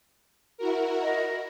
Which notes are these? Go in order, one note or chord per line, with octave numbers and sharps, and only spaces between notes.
E4 F#4 A#4
D#5